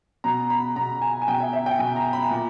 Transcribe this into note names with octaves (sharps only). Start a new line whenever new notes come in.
B2 A#5
B5
B2 A#5
G#5
G#5
B2 G5
E5
E5
G5
B2 G#5
A#5
B5
A#2